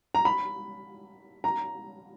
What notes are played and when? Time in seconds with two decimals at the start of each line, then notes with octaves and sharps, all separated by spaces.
0.15 A#5
0.25 B5
1.44 A#5